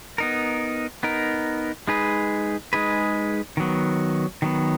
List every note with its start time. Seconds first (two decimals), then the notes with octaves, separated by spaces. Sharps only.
0.18 B3 D#4 A#4
1.03 B3 D#4 A#4
1.88 G#3 D#4 G#4 B4
2.73 G#3 D#4 G#4 B4
3.57 D#3 F#3 B3
4.42 D#3 F#3 B3